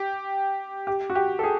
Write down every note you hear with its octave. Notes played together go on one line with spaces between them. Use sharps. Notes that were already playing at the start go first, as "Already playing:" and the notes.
Already playing: G4
G4
F#4
G4
A4
G#4